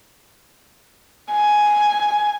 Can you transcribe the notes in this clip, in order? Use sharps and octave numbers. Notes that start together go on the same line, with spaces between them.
G#5